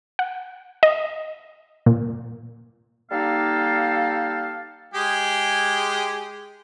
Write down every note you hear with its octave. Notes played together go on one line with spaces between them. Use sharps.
F#5
D#5
A#2
G3 A#3 D#4 A4 F5
G#3 G4 G#4